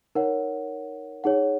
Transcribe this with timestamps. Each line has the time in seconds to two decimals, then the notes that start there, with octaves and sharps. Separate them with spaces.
0.15 D#4 A#4 C#5 F#5
1.24 D#4 G#4 C#5 F#5